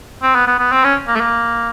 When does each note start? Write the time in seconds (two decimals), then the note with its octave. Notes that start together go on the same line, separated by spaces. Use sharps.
0.22 C4
0.35 B3
0.47 B3
0.59 B3
0.72 C4
0.84 C#4
1.07 A#3
1.15 A3
1.20 A#3